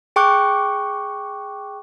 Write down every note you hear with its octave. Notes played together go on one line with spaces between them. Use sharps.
G#4 G5 C#6 D6 F#6